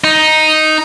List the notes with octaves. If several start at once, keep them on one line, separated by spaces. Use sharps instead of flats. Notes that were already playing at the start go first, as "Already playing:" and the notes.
D#4